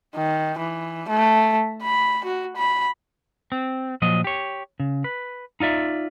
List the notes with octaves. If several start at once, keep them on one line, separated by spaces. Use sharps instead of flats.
D#3
E3
A3
B5
F#4
B5
C4
A#2 F3 F#3 D#5
G4 C#5
C#3
B4
D#4 F4 D5 E5